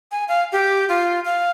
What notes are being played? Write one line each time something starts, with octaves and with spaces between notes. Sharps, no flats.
G#5
F5
G4
F4
F5